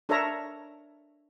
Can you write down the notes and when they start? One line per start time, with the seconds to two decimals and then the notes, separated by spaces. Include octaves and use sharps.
0.09 D4 A4 A#4 C#5 E5 A#5